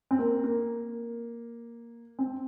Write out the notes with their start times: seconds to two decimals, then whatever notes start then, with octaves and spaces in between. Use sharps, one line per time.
0.11 C4
0.19 A#3
0.44 A#3
2.19 C4